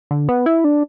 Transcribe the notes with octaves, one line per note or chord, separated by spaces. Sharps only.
D3
B3
E4
D4